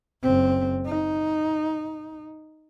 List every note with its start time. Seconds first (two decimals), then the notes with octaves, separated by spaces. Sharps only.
0.23 F#1 C4
0.86 D#4